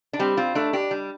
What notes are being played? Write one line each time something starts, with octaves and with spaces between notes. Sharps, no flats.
D4
G3 C4
C4 F4
A3 D4
D4 G4
G3